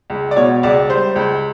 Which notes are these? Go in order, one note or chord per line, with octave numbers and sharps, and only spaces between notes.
C#2
D5
B2 C#5
C#2 D5
G3 C5
C#2